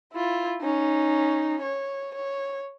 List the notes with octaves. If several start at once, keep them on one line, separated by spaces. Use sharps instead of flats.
E4 F4
C#4 D#4
C#5
C#5